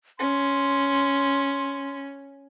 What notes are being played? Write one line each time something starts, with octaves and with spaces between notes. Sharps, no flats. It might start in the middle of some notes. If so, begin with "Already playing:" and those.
C#4 C6